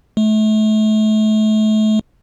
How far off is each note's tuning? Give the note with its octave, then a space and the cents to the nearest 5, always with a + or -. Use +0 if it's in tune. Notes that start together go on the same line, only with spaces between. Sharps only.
A3 -30